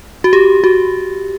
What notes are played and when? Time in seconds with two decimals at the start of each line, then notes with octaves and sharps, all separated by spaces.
0.24 F#4
0.33 G4
0.64 F#4